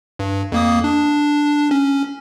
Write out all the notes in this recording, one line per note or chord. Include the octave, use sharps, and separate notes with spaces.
G2
F2 A#3 D#6
D4
C#4